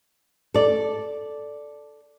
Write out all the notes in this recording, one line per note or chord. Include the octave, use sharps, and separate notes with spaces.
A4 D5